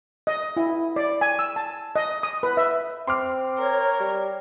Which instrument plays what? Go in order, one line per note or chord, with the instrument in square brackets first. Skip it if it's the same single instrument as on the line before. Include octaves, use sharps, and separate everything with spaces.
[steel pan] D#5
E4
D5
G#5
E6
A5
D#5
D#6
B4
E5
[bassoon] C4 [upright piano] C6 D6 F6
[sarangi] A#4 [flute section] C#5
[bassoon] G3